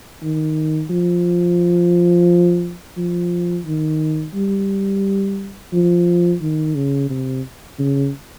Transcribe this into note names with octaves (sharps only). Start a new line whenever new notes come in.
D#3
F3
F3
D#3
G3
F3
D#3
C#3
C3
C#3